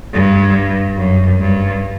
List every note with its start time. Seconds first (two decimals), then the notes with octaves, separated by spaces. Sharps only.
0.13 G2
0.97 F#2
1.39 G2